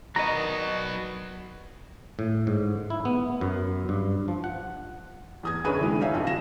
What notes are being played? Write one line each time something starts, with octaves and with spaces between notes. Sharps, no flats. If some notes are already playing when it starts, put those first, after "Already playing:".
D#3 F#3 B3 D5 D#5 A#5
A2
G#2
E4
B3
F#2
G2
F3
F#5
E2 D#6 G#6
F#2 D3 G#4 B4 C#5 D#7
C3 D#3 E3 G#3
D#4 C#5 E5 F5
F2 D3 F4 F#4
A#6 E7